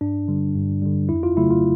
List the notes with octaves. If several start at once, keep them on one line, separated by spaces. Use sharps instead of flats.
G2 D4
D3 G3
G2
D3 G3
F2 E4
F4
C#3 F#3 A3 E4
F4